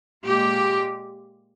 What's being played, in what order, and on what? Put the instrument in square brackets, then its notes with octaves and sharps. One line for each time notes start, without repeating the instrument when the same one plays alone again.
[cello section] A#2 G#3 G4